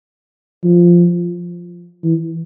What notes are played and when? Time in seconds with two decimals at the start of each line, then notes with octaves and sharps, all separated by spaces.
0.64 F3
2.04 E3